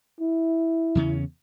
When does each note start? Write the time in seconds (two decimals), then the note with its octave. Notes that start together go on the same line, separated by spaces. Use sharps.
0.21 E4
0.95 E2 C#3 C#4